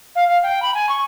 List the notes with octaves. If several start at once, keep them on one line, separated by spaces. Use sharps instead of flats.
F5
F5
G5
B5
G#5
C#6